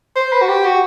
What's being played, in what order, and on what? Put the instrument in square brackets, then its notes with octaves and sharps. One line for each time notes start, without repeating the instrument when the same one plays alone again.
[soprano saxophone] C5
B4
F#4
G4
F#4